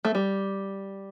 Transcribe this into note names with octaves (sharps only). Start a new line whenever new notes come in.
A3
G3